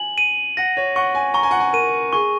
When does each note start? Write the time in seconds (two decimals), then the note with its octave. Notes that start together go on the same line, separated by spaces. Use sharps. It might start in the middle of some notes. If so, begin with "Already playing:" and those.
Already playing: G#5 F#7
0.18 D#7
0.57 F#5 A#6
0.77 C#5
0.96 F#5 C#6
1.15 G#5
1.34 A#5 C#6
1.43 G#5
1.51 F#5
1.60 G#5
1.73 A#4 D#7
2.13 G#4 C#6